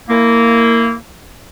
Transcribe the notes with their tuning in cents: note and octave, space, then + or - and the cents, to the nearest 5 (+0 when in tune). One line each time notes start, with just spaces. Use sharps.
A#3 -15 E4 +0